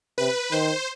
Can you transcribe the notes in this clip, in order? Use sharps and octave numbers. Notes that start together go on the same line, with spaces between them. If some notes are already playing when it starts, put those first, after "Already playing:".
C3 B4
D#3 C5